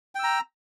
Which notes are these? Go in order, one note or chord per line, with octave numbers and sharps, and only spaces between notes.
G5 A#5 E6